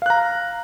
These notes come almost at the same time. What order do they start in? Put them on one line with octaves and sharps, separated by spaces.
F5 F#6 A#5